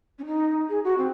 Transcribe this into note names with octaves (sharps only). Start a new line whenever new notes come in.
C#4
D#4
G#4
F#4
C4